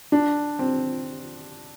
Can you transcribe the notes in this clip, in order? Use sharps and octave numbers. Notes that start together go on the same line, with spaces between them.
D4
C4